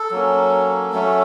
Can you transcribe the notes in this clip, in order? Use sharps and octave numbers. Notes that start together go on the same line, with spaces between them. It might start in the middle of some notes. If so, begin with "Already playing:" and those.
Already playing: A4
F#3 A#3 C#4
F#3 A3 C#4